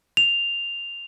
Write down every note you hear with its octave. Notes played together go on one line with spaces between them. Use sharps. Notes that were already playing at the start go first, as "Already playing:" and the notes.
F7